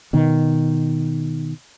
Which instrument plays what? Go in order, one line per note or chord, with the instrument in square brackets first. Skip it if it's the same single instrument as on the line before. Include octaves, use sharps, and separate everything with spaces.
[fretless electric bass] B2 D#3